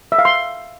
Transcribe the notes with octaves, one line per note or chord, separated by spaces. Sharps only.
E5
F5
C6